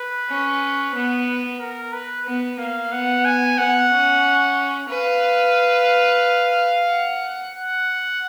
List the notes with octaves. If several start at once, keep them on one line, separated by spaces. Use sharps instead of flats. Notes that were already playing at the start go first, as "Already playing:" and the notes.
Already playing: B4
C#4
B3
A#4
B4
B3
A#3 F5
B3 F#5
G#5
B3 F#5
C#4
B4 F5
F#5
F#5